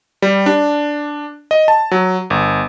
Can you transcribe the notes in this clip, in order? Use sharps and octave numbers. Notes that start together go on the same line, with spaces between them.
G3
D4
D#5
A5
F#3
G1